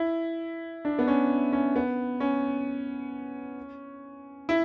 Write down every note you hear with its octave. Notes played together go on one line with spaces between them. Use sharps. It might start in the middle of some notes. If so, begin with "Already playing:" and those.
Already playing: E4
D4
B3
C#4
C#4
B3
C#4
E4